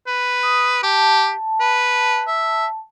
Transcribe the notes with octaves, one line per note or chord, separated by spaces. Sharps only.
B4
D#6
G4 A5
B4
E5